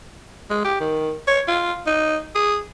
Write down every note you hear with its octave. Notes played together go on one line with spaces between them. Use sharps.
G#3
G4
D#3
C#5
F4
D#4
G#4